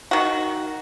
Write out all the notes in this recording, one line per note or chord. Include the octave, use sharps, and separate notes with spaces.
D#3 F#4